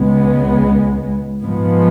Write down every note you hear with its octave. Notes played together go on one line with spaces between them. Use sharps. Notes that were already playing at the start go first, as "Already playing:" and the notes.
Already playing: C#2 C#3 G#3 B3
G#2 F3 G#3 B3